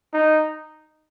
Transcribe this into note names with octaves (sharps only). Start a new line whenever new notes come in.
D#4